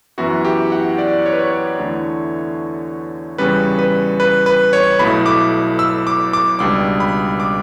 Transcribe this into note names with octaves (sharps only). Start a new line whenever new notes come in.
F#2 E3 B3 E4 F#4
G4
F#5
D5
C#5
B4
C#5
C#5
E2 D3 A3 E4
E2 C#3 G3 C#4 B4
B4
B4
B4
C#5
B1 B2 A3 E4 B5
D6
E6
D6
D6
C#2 B2 G3 D4 D6
B5
D6